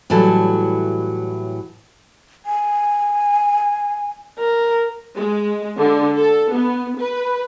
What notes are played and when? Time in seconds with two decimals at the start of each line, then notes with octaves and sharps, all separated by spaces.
0.10 A2 E3 F#3 G3 A4
2.46 G#5
4.39 A#4
5.17 G#3
5.79 D3
6.18 A4
6.53 B3
7.00 B4